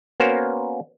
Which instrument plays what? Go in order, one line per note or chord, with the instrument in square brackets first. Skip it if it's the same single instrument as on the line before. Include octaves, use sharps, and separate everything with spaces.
[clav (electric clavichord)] A#3 B3 C#4 F#4 A#4 C5